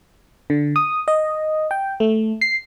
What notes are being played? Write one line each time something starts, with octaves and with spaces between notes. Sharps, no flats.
D3
D#6
D#5
G5
A3
C7